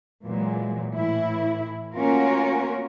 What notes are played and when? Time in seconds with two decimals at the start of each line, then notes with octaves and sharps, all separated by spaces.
0.24 A#2 E3 F#3 G#3
0.96 A2 E3 E4
1.96 A3 A#3 C#4 F4 F#4 A#4